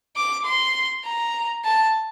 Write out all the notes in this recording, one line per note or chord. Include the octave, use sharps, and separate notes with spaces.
D6
C6
A#5
A5